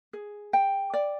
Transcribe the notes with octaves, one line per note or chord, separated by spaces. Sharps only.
G#4
G5
D5